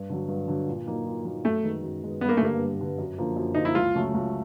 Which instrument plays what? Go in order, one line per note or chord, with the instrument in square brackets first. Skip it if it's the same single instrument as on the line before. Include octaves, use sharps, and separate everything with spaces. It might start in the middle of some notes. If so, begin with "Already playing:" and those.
Already playing: [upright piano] G2
D3 F#3
G2
D3 F#3
A#2
F#3 A#3 D#4
A#2
F#3 A#3 D#4
[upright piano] F#2 [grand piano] A3
[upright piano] D#3 G#3 B3
F#2
D#3 G#3 B3
[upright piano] G2 [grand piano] B3
[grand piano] A#3
A3
[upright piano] D3 G3 B3 [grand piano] A#3
[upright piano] G2
D3 G3 B3
F#2
D3 F3 A#3
F#2
[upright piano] D3 F3 A#3 [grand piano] D#4
[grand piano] E4
[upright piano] C#2 [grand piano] F4
[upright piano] C#3 F#3 A3 C#4
C#2